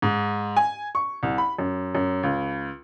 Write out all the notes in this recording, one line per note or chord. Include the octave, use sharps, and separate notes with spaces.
G#2
G#5
C#6
C2
B5
F#2
F#2
C#2